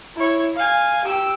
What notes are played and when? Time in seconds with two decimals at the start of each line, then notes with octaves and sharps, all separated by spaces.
0.16 E4 C#5
0.56 F5 G#5
1.04 G4 E6